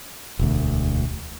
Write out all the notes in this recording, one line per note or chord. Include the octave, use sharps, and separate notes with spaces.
E1 D2